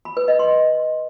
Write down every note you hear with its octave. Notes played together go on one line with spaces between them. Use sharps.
B5
B4
D#5
C6